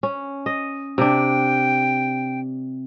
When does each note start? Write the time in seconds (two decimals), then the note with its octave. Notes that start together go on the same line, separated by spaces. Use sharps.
0.03 C#4
0.46 D#5
0.98 C3 D4 G5